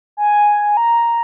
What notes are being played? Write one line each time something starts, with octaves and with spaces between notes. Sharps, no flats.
G#5
A#5